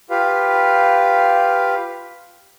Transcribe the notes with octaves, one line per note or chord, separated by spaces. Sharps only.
F4 G4 B4 F5